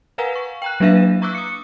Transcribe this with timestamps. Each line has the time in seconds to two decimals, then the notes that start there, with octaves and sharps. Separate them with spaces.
0.18 A#4 B4 F5 F#5 G#5 A#5
0.35 C#6
0.62 G5 A#5 F#6
0.80 F#3 A#3 D4 B4 E5 F5
1.22 A#5 C#6 D6 E6 F#6
1.35 D#6 C#7